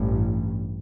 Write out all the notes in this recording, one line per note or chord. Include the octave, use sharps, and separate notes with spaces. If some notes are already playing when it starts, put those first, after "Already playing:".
Already playing: A1 G2